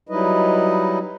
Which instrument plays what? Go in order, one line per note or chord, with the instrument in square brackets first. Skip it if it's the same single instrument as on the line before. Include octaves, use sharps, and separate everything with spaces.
[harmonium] F#3 G3 D#4 E4 B4 D#5